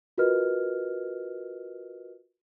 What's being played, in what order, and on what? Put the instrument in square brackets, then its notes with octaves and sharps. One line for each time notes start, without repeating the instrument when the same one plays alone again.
[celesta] F4 F#4 A#4 B4 D#5 F6